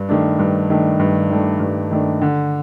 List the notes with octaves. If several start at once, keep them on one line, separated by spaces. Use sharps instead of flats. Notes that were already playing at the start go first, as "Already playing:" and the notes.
Already playing: G2
D#3 A3 D4
G2
D#3 A3 D4
G2
D#3 A3 D4
G2
D#3 A3 D4
D3